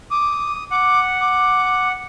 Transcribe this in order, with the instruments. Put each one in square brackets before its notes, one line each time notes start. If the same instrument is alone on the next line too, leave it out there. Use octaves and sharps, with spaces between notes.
[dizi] D6 [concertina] D#6
[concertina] F#5 [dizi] D6
[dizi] D6